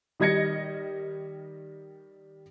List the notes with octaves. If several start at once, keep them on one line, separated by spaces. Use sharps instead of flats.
D#3 G3 D#5 G#6 A#6 C#7